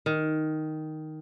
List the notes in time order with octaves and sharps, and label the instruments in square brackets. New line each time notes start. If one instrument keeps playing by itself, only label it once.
[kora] D#3